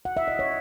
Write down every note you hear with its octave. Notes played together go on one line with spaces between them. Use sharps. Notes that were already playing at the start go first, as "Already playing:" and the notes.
F#5
E5
D#5
C#5